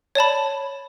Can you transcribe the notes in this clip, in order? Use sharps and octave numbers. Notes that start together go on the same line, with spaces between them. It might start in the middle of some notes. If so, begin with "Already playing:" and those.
C#5 D5 A5 B5